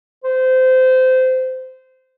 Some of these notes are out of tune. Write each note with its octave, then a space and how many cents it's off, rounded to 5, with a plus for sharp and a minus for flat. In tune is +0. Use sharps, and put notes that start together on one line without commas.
C5 -20